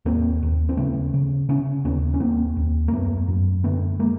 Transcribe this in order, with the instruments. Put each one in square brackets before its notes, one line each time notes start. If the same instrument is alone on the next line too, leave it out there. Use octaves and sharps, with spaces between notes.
[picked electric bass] D#2 A#3 C4
D#2
C4
C#3 A3 B3
C#3
C#3 B3 C#4
D#2 B3 C#4
C#4
D#2 A#3 C4
D#2
A#3
F#2 A3 B3
F#2
D3 A3 B3
G#3 A#3